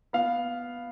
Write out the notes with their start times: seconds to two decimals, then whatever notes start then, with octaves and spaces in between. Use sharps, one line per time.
0.13 B3 F5